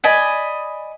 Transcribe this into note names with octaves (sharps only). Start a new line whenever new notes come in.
D5 D#5 G#5 B5